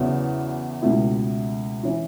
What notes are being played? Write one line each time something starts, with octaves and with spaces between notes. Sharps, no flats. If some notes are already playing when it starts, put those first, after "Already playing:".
Already playing: E2 C#3 F#3 B3 E4
C#2 B2 A3 E4
E3 C#4 E4